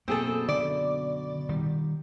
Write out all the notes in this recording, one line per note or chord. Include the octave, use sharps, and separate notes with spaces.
F#2 B2 A#3 C4 G#4 A4
D3 D5
D#3 G3